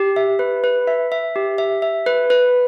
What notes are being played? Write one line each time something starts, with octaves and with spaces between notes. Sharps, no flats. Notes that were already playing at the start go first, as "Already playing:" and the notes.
Already playing: G4
E5
B4
B4
E5
E5
G4
E5
E5
B4
B4